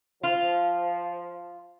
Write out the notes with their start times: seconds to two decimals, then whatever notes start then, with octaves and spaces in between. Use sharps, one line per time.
0.23 F3 F4